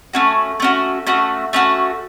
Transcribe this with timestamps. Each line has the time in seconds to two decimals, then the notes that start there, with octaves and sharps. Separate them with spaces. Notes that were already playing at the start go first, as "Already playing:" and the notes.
0.13 A3 C#4 F#4
0.60 A3 C#4 F#4
1.07 A3 C#4 F#4
1.53 A3 C#4 F#4